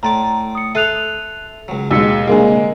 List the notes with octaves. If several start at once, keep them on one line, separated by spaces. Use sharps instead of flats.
A2 D5 A#5 C6 D6
D#6 C#7
A4 E5 C6 D#6 F#6 F7
C#2 F#3
D#2 B2 G#3 E6 B6 C#7
C2 A#2 D3 G#3 A#3 G#4 D#5 G#5